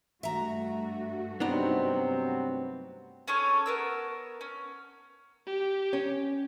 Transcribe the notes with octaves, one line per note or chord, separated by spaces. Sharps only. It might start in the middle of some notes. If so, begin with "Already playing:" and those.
G2 A3 F#4 E5 A#5
C3 F#3 B3 C4 D4 D#4
C#4 G#4 A4 C#5
B3 A#4 E6
C#4
G4
C#4